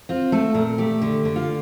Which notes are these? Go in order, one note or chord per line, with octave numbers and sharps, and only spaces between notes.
C4 F4
A3 A4
A#2 A#4
A3 G4
D3
D3
F4